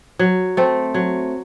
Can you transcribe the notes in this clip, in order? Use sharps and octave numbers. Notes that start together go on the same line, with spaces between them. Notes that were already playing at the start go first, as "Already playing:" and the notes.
F#3
A3 C4
F#3